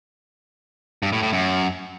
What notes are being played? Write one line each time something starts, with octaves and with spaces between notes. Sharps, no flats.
G2
A2
A2
F#2